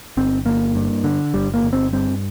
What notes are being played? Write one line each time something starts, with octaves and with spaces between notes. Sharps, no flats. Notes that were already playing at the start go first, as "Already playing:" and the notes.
G1 C4
G1 A#3
G2
D3
G1 G3
A#3
G1
C4
G2 C4